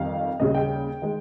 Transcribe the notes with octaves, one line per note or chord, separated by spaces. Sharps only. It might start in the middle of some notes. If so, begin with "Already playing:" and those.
Already playing: F2 D#3 G3 F5
D#2 C#3 G3 D#5
G5
D#3 G#3